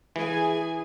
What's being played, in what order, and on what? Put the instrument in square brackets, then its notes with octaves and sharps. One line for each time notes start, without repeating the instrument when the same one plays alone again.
[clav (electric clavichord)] E3 [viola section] G#4 G#5